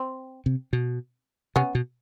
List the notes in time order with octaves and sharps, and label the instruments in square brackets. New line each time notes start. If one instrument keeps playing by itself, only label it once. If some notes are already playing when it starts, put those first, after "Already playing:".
Already playing: [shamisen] C4
[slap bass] C3
B2
[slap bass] C3 [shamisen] B3 C#4
[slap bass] B2